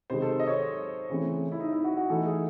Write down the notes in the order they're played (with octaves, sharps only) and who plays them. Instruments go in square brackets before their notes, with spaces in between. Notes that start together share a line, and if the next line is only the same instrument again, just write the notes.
[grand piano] C3 D#3 G#3 [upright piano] C5
[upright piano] A4
D#5
C#5
[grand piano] C#3 E3 A3 C4
[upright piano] E4
D#4
E4
F#4
F#4
[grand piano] E3 A3 D#4 [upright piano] A4
[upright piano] G#4